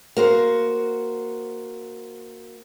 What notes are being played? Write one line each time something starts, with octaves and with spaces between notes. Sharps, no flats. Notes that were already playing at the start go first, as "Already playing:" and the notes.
A#3 F#4 C5